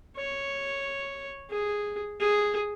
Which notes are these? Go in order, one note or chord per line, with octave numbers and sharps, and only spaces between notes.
C#5
G#4
G#4